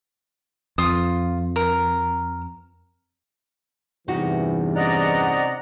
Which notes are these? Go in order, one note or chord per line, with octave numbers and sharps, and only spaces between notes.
F2 F4 D#6
A#4
E2 G2 C3 E3 D#4 F#4
C#4 C5 D5 D#5 F#5 A#5